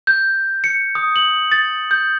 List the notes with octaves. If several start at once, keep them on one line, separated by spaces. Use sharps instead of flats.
G6
C#7
D#6
F#7
A6
G6